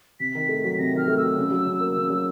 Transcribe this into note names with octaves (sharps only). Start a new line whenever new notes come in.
C3 B6
D#3
A3
F#3
C3 A#6
D#3 F6
A3
E6
F#3
C#3
F#3
C#3
A#3
C#3
F#3